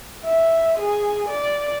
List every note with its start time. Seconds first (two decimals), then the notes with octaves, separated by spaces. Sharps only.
0.25 E5
0.79 G#4
1.29 D5